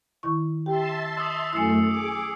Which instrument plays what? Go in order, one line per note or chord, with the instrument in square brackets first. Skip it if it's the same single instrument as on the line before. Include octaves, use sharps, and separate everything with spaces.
[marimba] D#3 E4 C#6
[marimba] G4 G5 [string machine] E5 A5 C6
[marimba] D#5 [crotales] D#6 E6
[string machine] F#2 A3 [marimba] E4 G#5 [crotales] E6 C7 C#7
[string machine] G#4 D6